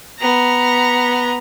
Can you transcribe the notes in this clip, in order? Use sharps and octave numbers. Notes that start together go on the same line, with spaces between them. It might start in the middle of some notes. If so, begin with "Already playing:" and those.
B3 A#5